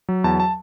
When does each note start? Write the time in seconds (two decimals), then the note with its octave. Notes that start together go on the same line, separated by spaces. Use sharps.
0.09 F#3
0.24 E2 A5
0.40 A5